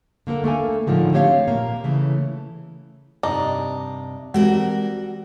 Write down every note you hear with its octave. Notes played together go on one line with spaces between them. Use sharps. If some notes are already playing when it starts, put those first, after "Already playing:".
D3 A#3 A4 A#4
A3 A#3 A4 G#5
A2 D3 D#3 F3 G#3
A3 C4 G4 C#5 D#5 F5
A#2 A#3
C#3 E3 A3
G2 C3 D4 D#4
E3 G3 G#3 C4 F#4 A#4